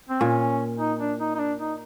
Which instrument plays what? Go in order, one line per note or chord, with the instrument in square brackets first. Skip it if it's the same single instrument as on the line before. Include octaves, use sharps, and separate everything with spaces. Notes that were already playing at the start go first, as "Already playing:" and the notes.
[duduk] C4
[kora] A#2 [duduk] C#4
[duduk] D#4
D4
D#4
D#4
D4
D#4